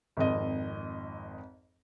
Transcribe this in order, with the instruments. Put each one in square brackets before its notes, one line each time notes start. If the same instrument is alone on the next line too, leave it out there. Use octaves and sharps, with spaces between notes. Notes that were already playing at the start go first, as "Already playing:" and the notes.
[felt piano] G#1 F2 D#5